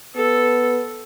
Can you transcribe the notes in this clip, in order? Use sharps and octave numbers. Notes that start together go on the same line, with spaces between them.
B3 A4